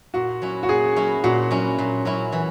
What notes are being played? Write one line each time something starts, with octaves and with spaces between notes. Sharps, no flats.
A#2 F#4
F#3 C#4 E4
F#4
A#2 G#4
F#3 C#4 E4
A#2 F#4
F#3 C#4 E4
A#2
F#3 C#4 E4
E3